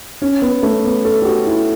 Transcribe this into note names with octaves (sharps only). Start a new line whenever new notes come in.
C#4
B3
A3
B3
A4
G4
F#4
E4